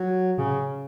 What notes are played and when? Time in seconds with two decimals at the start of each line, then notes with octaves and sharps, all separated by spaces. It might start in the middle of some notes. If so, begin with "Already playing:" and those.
Already playing: F#3
0.38 C#3